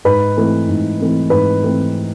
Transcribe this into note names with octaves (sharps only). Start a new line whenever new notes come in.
G#2 B4
E3 A3 C4
G#2
E3 A3 C4
G#2 B4
E3 A3 C4